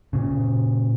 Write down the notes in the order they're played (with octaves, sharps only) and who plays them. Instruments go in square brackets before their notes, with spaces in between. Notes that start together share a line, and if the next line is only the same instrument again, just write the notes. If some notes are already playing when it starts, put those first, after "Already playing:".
[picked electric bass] A#2 C#3